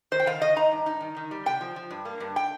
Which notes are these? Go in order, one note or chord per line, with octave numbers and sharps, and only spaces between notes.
D#3 C5
G5
D#3 F5
D#3 D#5
D#4 A#5
G2
D#4
D#3
D#3
G3
C3 G5
F3
F3
G2
A#3
G2
G5